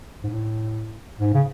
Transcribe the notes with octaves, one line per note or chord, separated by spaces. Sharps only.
G#2
A2
G#2
C#3